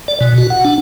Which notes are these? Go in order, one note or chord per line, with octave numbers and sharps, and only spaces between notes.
D5
B2
F#4
F#5
D4